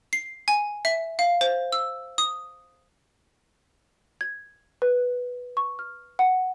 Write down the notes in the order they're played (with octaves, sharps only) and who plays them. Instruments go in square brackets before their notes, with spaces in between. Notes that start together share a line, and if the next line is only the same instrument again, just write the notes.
[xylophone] C7
G#5
E5
F5
C5
E6
D#6
G#6
B4
C#6
F6
F#5